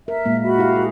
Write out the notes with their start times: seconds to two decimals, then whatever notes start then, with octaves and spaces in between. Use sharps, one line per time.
0.08 A#4 E5
0.26 A#2 G#3 A#3
0.43 F#4 E5 B5
0.58 E4 G4 F5
0.76 G#4